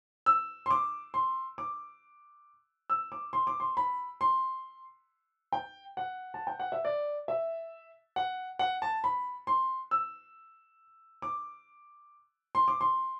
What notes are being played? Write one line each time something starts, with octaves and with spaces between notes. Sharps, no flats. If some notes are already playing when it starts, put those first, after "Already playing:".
E6
C6
D6
C6
D6
E6
D6
C6
D6
C6
B5
C6
G5
F#5
A5
G5
F#5
E5
D5
E5
F#5
F#5
A5
B5
C6
E6
D6
C6
D6
C6